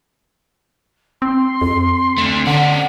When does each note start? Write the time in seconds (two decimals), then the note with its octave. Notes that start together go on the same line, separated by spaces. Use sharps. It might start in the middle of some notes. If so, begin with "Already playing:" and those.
1.22 C4 C6
1.62 F2 C4
2.18 A3 D4
2.47 D3 C#4 D5 F#5